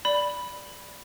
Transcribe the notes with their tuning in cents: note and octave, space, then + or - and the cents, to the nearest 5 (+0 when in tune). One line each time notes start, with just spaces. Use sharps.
D5 -5 B5 +0